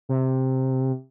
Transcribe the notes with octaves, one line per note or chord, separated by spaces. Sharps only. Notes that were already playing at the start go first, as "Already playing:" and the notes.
C3